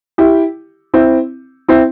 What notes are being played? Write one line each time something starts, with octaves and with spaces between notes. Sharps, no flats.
E4 G4
C4 E4
C4 E4